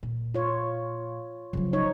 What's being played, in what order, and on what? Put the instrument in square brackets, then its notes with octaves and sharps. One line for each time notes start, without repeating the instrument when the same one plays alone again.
[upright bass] A#2
[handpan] F4 C#5
[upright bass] C#3 F#3 [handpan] F3
[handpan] D#4 C#5